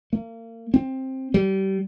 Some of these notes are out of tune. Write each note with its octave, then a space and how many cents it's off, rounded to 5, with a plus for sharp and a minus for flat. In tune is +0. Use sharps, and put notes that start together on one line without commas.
A#3 -35
C4 +10
G3 -30